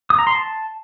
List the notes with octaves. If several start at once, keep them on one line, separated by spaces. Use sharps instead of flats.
D#6
A#5
C6
A5